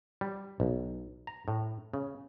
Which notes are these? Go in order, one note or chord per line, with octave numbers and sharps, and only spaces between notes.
G3
B1
A#5
A2
C#3